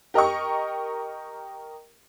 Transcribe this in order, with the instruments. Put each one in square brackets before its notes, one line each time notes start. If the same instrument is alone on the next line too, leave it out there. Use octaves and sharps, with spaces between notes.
[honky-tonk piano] G4 A#4 D#5 G5 C#6